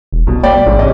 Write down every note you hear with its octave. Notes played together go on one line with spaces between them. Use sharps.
E1
C2 B2
A#3 D5 G5 B5
A1 G#2
C2 C#4 D#5